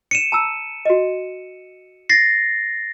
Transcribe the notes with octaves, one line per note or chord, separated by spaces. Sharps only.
C#7 D#7 E7
A5 A#5 E6
F#4 D#5
A6 A#6 C7